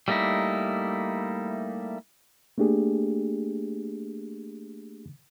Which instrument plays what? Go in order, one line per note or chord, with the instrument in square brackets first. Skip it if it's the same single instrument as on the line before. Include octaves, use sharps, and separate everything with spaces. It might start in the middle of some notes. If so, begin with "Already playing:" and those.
[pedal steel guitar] G3 A3 A#3 D#4 E4
[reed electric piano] A3 A#3 D4 G4 G#4